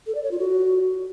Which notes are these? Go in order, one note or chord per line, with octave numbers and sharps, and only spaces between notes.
A4
D5
C#5
F4
F#4